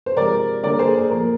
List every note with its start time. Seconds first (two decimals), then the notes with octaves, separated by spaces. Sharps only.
0.06 C5
0.17 C3 F3 G#3 A#4 D5
0.63 D3 G3 A#3 A#4 D5
0.79 G#4 C5
0.94 A#4
1.10 A#2 F3 A#3 A#4